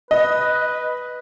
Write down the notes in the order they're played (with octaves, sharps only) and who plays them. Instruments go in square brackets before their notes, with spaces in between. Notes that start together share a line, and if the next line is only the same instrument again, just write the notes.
[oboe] B4 [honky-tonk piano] D#5